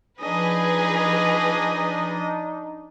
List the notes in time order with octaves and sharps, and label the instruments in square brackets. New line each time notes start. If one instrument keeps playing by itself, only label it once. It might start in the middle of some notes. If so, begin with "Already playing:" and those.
[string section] F3 G#4 B4 [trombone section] D4 D#4 [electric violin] D#5